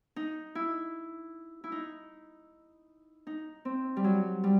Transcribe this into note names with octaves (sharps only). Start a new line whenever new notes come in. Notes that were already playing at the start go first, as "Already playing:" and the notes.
D#4
E4
E4
D#4
D#4
C4
G3
F#3
G3